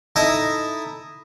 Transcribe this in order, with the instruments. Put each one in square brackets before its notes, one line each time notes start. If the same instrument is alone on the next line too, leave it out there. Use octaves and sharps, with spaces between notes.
[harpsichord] D#4 E4 A4 D#5 E5